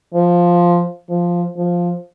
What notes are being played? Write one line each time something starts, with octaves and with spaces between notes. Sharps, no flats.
F3
F3
F3